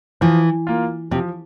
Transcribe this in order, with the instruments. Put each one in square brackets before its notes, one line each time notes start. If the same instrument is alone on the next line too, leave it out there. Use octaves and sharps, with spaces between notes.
[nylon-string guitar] E3 [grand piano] F3
[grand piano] A#3 F4
[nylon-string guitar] C3 [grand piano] F3